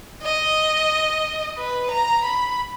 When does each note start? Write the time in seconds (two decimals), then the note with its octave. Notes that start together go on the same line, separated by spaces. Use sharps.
0.22 D#5
1.58 B4
1.91 A#5
2.25 B5